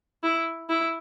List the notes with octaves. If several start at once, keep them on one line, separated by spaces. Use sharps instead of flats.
E4
E4